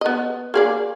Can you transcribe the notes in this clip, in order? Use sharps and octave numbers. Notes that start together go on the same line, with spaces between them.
B3 D#5
A#3 G#4 D5